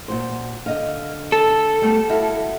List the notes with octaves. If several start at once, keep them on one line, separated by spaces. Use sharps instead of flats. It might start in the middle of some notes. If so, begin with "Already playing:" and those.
A#2 F#4 C5
D3 D#5 F5
A4
G3 A3 B3
E4 F#4 F5